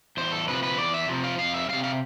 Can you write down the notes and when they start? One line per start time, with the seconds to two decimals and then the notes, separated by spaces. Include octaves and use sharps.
0.17 E2 C5
0.32 A4
0.48 C3 F3 B4
0.63 B4
0.78 E2 D5
0.94 E5
1.08 C3 F3
1.24 F5
1.39 F2 F5
1.54 E5
1.69 C3 G3 F5
1.84 F5